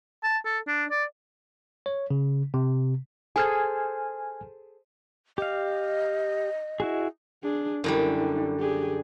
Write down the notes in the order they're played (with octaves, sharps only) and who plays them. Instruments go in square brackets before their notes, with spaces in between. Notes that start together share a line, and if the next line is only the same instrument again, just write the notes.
[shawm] A5
A4
D4
D5
[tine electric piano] C#5
C#3
C3
[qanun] G#4 A4 C5 [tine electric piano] G#5 F6 G#6
[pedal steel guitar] G4 F5 [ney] D#5
[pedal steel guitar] E4 F#4 G#4
[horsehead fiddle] D4 G#4
[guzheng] F#2 D3 G3 [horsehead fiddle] E4
[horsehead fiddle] G4 G#4